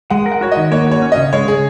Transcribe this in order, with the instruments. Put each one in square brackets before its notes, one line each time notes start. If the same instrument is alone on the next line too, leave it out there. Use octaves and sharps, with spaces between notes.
[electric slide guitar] G#3 [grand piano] F#5
[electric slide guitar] A#4
[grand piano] F#5
[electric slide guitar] F#4 [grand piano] C#5
[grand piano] D#5
[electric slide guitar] D#3
[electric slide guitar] A#3 [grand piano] C#5
[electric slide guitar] F#4 [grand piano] C#5
[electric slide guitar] C#4
[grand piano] D#5
[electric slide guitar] C#3
[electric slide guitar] G#3 [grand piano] C#5
[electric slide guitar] C#3 [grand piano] G#4